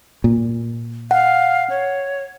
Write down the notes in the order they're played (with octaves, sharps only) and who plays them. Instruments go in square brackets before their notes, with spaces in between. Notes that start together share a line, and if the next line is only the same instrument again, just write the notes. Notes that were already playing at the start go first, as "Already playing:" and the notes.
[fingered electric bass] A#2
[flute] F5 [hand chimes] F#5
[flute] C#5